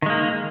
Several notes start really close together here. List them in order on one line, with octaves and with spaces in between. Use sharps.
D#3 G#3 A#3